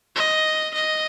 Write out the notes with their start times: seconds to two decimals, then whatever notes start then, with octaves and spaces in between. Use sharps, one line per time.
0.16 D#5
0.74 D#5